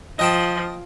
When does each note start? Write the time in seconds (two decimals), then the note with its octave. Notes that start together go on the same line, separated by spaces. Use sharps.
0.19 F3 D#5 G5 A5